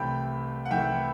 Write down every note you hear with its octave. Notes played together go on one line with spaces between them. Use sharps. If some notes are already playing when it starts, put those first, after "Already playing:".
Already playing: C2 C3 E3 A3 G5 B5
F#5
C2 C3 E3 A3 E5 G5